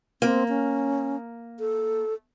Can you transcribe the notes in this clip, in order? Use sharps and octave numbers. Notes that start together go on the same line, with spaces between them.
A#3 C4
C#4
A4